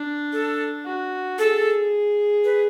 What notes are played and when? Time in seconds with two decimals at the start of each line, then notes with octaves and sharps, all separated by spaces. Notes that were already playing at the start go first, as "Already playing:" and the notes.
Already playing: D4
0.33 A4
0.86 F#4
1.38 G#4 A4
2.44 B4